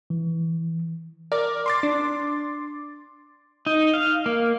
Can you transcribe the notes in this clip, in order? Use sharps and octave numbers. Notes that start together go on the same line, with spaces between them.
E3
A#4 D5
C6 D6 A6
D4
D#4
F5
A#3